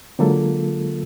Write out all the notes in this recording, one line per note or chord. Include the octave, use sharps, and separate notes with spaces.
D3 F#3 G#3 A#3 F4 A4